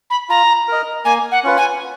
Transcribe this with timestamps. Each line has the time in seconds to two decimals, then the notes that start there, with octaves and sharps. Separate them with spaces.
0.10 B5
0.29 F4 A#5
0.68 A#4 D#5
1.05 A#3 G#5
1.32 F#5
1.43 C#4 F4 B4
1.57 G#5